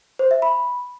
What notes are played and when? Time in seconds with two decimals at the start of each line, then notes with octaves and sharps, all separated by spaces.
0.19 C5
0.31 E5
0.42 B5